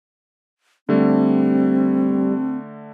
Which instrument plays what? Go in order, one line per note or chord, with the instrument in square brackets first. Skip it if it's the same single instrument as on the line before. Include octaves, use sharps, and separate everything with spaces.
[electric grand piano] D3 A3 [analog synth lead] G3 [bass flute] C4